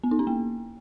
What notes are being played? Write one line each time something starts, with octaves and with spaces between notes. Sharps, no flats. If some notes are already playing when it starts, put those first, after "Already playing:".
B3
D#4
C#4
A#3